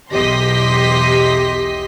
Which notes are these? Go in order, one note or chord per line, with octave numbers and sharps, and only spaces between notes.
B1 E2 G4 D#5 C6 B6